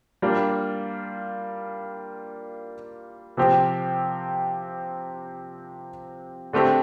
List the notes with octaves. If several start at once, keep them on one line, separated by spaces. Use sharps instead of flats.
G3 A#3 D4 F4
C3 F3 C4 G4
D3 A3 C4 G4